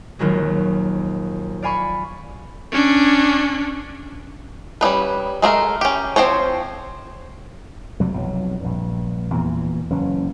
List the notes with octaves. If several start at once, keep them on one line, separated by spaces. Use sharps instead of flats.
A#1 D#2 D#3 F#3 G#3
D5 F5 G#5 B5 C#6
C#4 D4
G3 C#4 D#4 B4
G#3 A3 F#4 A#4
C#4 G4
F3 C4 C5 C#5
F2 C3 F#3 G3
B1 F2 B2 F#3
A#1 G2
E2 G2 A#2 E3
F#1 E3 C#4